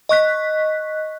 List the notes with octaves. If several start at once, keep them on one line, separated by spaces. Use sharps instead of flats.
D#5 C#6 F#6 B6